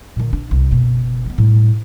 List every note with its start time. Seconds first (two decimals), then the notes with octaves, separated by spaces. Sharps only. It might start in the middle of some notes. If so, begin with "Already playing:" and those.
0.16 A#2 D#3
0.33 D4
0.51 C2
0.71 F#1 B2
1.26 D#3 B3
1.38 A2 G3